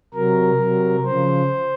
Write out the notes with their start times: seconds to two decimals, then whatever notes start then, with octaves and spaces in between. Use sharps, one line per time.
0.14 C3 F#3 A#4
0.60 C3 F#3
1.05 C#3 F3 C5